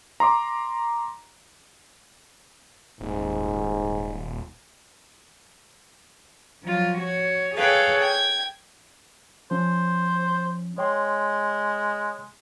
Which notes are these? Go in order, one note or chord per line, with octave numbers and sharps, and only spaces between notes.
A#5 C6 D6
D#1 G#2
F3 F#3 F4
F#4 C#5
G#4 A4 B4 C#5 F5 G5
G5 G#6
F3 C#4 C5
G#3 C#5 G5 C6